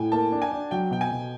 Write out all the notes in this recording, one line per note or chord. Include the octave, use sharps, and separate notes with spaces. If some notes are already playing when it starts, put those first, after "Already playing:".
Already playing: A2 G5 G#5
A#3 A5
D4
G#5
D4
F#3 G5
B2 G5
G#5
B2